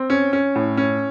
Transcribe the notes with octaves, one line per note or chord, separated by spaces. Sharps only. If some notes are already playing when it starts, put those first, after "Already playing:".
Already playing: C4
C#4
C#4
A2
C#4